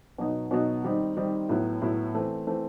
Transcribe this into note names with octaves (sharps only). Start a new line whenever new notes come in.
B2 F#3 B3 D#4
B2 F#3 B3 D#4
D#3 G3 C4 D#4
D#3 G3 C4 D#4
A2 F#3 B3 E4
A2 F#3 B3 E4
E3 A3 C4
E3 A3 C4